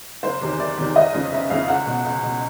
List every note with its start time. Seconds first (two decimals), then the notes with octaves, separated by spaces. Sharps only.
0.23 F#1 C5
0.41 E2 C3 D#3
0.59 F#1 D5
0.77 E2 C3 D#3
0.96 F1 D#5
1.13 F2 C#3 F3
1.32 F1 E5
1.50 F2 C#3 F3 F5
1.68 C#2 F#5
1.86 B2
2.05 C#2
2.23 B2